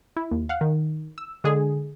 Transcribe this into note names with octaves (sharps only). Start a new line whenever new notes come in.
E4
D#2
F5 F#5
D#3
E6
D3 G#3 G#4